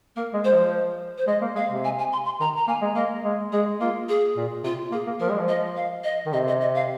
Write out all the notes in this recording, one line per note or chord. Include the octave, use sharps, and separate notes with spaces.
A#3 A#4
G#3
G#3 C5
F3
C5
G#3 D#5
A#3
G#3 F5
C3
G#5
G#5
C6
C6
D#3 A#5
A#5
A#3 G#5
G#3
A#3 D#5
G#3
G#3 G#4
A#3 F4
G#4
A#2
C3 F4
A#3 G#4
A#3
F3 A#4
G#3
F3
D#5
F5
D#5
D#3
C3 D#5
D#5
D#5
F5